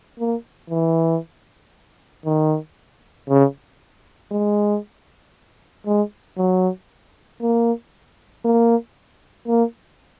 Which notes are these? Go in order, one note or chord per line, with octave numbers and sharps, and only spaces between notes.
A#3
E3
D#3
C#3
G#3
G#3
F#3
A#3
A#3
A#3